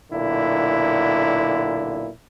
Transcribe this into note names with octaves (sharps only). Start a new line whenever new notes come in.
B1 A#2 D3 E4